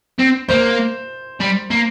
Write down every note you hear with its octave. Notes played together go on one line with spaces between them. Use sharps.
C4
A#3 C5
G3
A#3